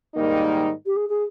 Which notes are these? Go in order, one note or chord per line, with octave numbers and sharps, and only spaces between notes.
G#2 D#3 G3 A#3 D#4
G4
G#4
G#4